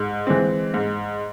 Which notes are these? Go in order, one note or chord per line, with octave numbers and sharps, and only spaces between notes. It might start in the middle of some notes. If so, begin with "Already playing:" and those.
Already playing: G#2
E3 G#3 C4
G#2